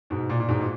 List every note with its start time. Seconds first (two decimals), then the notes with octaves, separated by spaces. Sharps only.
0.10 G#2 B2
0.30 A#2
0.40 A#2
0.48 G#2 B2
0.61 A#2